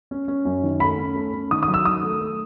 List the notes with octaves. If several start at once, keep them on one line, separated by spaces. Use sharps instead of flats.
C#4
C#4
F#2
D#3
A3 B5
C#4
A3
C#4
D#3 D#6
D#6
F#3
E6
D#3 D#6
A3
A3